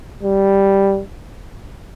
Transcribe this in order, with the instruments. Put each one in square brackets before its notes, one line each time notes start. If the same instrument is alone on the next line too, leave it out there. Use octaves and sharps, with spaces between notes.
[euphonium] G3